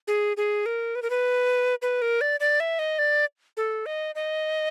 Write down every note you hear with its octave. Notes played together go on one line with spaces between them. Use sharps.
G#4
G#4
A#4
B4
A#4
B4
B4
A#4
D5
D5
E5
D#5
D5
A4
D#5
D#5